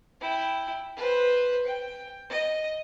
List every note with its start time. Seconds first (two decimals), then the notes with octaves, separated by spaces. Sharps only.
0.21 E4 G5
0.96 B4 C5
1.66 G5
2.30 D#5